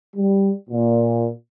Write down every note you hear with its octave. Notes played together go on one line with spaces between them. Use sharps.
G3
A#2